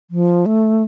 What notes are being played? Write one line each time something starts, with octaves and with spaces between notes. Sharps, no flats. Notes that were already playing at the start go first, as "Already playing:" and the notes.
F3
A3